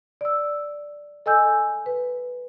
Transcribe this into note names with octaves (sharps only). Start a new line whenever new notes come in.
D5 E6
A4 D#5 G#5 E6 G6
B4